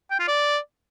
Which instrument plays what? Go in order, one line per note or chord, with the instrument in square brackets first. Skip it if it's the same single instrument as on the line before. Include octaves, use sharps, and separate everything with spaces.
[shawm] G5
F4
D5